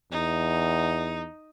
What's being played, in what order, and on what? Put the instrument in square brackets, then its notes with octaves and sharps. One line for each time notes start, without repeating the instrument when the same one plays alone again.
[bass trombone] E2 [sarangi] D#4